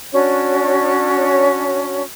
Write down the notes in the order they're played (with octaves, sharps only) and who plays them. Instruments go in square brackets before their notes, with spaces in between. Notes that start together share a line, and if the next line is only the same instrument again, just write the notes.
[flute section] C#4 D4 F#4 C#5